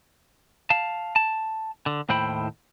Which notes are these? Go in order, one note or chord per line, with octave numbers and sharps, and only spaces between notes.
F5 A5
A5
D3
D#2 A2 E4 C5 G5 B5